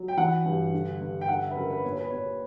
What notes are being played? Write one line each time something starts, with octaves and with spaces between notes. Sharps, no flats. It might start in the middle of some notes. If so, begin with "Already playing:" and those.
Already playing: F#3
G5
E3 F#5
G2
D3
G2
G5
D3 F#5
E5
B4
F#2 A#4
B4
A#2 C#5
B4
A#2 C#5